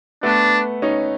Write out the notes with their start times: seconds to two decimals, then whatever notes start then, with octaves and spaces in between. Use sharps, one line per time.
0.23 A3 B3 D4
0.82 C#4 D#4